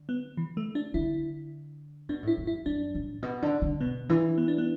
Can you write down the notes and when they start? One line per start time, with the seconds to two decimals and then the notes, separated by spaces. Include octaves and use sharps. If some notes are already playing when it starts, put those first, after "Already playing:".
Already playing: D3
0.09 B3
0.37 E3
0.57 A3
0.75 D4
0.94 D3 E4
2.09 B2 D4
2.23 A2 E4
2.37 F#2
2.47 E4
2.66 F#2 D4
2.95 A2
3.22 B2
3.42 D3
3.62 D3
3.81 B2 B3
4.09 E3 D4
4.38 B3
4.48 D4
4.58 B3